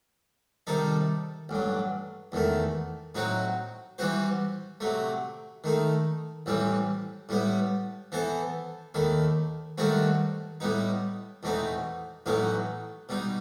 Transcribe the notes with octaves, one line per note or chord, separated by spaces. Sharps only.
C3 D#3 G3 D#4 A4
A1 G2 F#3
E2 D#3 A3
A2 F#3 C4 D#4 F#4
E3 G3 C4 F#4 C5
C3 F#3 A3
D#3 A3 D#4
A1 A2 E3 G3 C4
A2 G3 B3
E3 B3 E4 A4 C5
D#2 D#3 A3 E4
G2 D#3 A3 C4 F#4
A2 G3 B3 D#4
E2 B2 A3 C4 D#4
A1 A2 F#3 B3 D#4
B2 G3 D#4